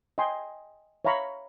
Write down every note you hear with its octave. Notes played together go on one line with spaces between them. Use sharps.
D#5 G5 G#5 C6
C#5 E5 F5 A#5 B5 C#6